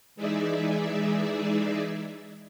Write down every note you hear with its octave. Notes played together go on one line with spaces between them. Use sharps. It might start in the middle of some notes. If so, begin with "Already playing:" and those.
E3 G#3 D#4 G#4 D5 E5